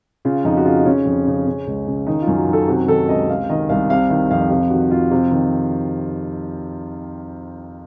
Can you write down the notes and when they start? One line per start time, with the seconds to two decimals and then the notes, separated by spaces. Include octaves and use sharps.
0.25 C#3 F4
0.44 F2 D#4
0.57 F#4
0.65 C#3 F4
0.77 D#4
0.86 C#3 C#4
1.06 F2
1.27 C#3
1.47 C#3
1.67 C#2
1.87 C#3
2.07 D#3 D#4
2.22 F4
2.27 F#2
2.37 F#4
2.48 D#3 A4
2.68 C3 F#4
2.88 D#3 A4
3.09 C#2 D#5
3.28 C3 F5
3.49 D#3 D#5
3.69 C2 F5
3.90 C3 F5
4.10 D#3 F5
4.31 F2 F5
4.50 C3 F5
4.70 D#3 F#4
4.91 F2 F4
5.11 C3
5.31 D#3